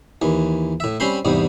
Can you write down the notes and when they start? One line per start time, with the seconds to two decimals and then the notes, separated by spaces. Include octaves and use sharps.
0.22 D#2 E3
0.80 A2 E5
1.00 G3 C4 C#4 C5 B5 C6
1.25 E2 G#2 C3 G3